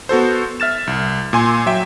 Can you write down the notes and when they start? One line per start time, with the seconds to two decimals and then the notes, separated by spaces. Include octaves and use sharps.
0.09 B3 F#4 A4 C5
0.60 E5 F6 A6 E7
0.87 C2
1.33 A#2 G#5 C6
1.66 F#3 E5 G5